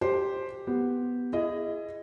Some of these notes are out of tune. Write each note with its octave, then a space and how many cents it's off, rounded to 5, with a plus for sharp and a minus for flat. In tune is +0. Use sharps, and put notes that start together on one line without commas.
G4 +0 C5 +0
B3 +0 G4 +0
E4 +30 G#4 -5 D#5 +0